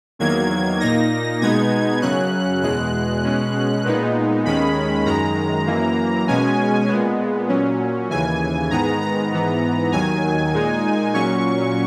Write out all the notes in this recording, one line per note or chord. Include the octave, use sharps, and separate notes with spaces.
E2 D#3 F#3 A#3 G#6
A#2 A#3 D#4 A#6
B2 G#3 B3 D#4 G#6
F#2 C#3 F#3 C#4 F#6
E2 B2 G#3 F#6
B2 G#3 C#4
A#2 G#3 B3 D#4
D#2 D#3 G#3 C#4 B5
F#2 D#3 G#3 A#5
F#2 E3 A#3
B2 G#3 C#4 G#5
A#2 G#3 B3
A#2 F#3 C#4
D#2 C#3 E3 G#5
G#2 D#3 G#3 B3 A#5
A#5
G#2 E3 B3
D#2 D#3 F#3 G#5
A#2 G#3 D#4
A#2 F#3 C#4 C#6